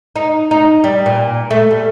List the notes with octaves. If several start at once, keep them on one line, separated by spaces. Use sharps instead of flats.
D#4
D#4
G3
A#2
A3
G3